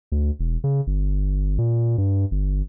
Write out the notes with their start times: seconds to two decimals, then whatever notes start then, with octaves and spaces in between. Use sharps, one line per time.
0.12 D2
0.39 E1
0.64 C#3
0.87 G1
1.58 A#2
1.98 G2
2.31 G1